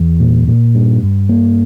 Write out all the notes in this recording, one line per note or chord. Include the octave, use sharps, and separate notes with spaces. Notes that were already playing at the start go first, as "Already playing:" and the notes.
Already playing: E2
A#2
A#2
G2
G2
A#3